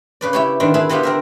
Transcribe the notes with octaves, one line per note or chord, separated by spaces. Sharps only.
C#3 B4 D5
E4 G4 C#5
D3 D#3 B3 C4 D4
E4 G#4 A4 B4
D3 G3 B3 F4 G4
C4 A#4 E5